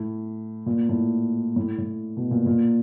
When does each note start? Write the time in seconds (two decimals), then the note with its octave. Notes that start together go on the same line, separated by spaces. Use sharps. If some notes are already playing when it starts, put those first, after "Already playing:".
Already playing: A2
0.66 A#2
0.89 A2
1.56 A2
1.78 A2
2.17 B2
2.31 A#2
2.46 A#2